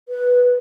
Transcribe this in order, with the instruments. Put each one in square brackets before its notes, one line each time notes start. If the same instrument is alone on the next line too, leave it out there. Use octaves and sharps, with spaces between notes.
[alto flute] B4